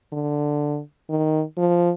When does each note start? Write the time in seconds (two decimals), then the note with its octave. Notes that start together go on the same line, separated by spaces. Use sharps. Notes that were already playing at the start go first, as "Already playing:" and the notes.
0.13 D3
1.09 D#3
1.58 F3